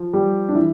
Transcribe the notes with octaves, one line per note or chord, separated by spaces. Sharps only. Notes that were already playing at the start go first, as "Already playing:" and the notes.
Already playing: F3
G3 G4
D4
E3 E4